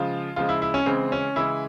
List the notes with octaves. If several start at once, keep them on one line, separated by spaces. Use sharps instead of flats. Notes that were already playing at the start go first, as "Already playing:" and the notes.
Already playing: C#3 F3 G#3 F4
C#3 F3 G#3 F4
E4
E4
C#4
C#3 E3 G#3 C4
C#4
C#3 E3 G#3 E4